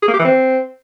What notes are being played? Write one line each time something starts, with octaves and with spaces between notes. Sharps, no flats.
G#4
A#3
G4
E3
C4